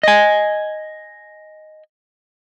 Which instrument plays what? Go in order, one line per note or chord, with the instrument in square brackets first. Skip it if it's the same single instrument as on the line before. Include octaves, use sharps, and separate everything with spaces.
[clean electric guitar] D#5 G#5